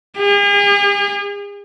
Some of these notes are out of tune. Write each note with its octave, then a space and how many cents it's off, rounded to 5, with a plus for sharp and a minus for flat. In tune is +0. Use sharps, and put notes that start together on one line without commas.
G#4 -45